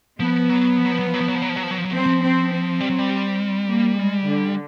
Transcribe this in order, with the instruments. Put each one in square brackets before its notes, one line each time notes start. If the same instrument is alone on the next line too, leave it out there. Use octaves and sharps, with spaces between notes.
[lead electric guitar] F3 [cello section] B3
[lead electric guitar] F#3
F3
F#3
F3
F#3
F3
F#3
F3
F#3
F3
F#3
F3
F#3
F3
F#3
F3
F#3
[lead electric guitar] F3 [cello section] C4
[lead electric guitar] F#3
F3
[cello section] C4
C4
[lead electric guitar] G3
F#3
G3
[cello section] A#3
G#3
D3